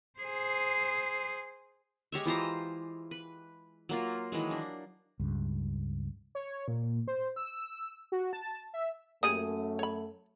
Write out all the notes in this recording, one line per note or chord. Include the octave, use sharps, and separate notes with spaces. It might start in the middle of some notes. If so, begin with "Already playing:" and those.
G#4 C5
G#3 G4 C#5 E5
E3 F4 C5 A#5
B4
F#3 A#3 F4
D#3 E3 F#3 G#3
A#3 D4
C#2 G2
C#5
A#2
C5
E6
F#4
A5
E5
F#2 A3 A#3 G4 G#4 D#6 D#7
C#5 B5